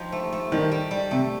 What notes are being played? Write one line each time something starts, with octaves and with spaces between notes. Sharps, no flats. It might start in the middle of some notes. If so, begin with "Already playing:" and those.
Already playing: F3 D#4 G4
A3
A3
D#3 G3
G3
G3
C3 A3